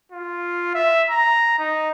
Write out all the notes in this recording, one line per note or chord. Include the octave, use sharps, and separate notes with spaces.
F4
E5
A#5
D#4